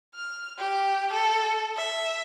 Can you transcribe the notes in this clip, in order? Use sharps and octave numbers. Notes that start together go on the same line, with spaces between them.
F6
G4
A4
E5